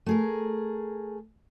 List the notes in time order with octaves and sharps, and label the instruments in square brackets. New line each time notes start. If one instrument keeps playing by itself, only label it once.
[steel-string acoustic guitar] A3 G#4 A#4